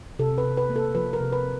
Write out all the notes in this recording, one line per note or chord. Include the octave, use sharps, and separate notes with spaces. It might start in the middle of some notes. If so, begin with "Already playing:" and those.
C3 A4
B4
C3
B4
A#3
A4
F3 B4
A#4
C3
B4